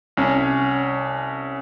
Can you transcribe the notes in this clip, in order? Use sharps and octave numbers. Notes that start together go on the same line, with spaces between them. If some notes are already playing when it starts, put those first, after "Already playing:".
C2 C#4